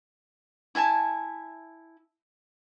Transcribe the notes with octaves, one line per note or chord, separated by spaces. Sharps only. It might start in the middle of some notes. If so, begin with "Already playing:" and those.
E4 E5 G#5 A5